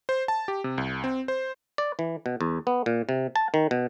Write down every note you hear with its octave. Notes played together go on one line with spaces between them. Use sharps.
C5
A5
G4
C3
C2
C4
C5
D5
E3
B2
E2
B3
A#2
C3
A5
D#3
B2